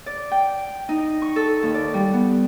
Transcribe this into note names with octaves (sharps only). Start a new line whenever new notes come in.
D5
G5
D#4
C#6
A4
D#2
D5
G3
B3